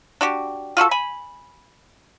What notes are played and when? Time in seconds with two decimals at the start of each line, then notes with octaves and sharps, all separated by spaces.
0.21 D4 F#4 G4
0.77 F4 F#4 G#4 A4
0.91 G#5 B5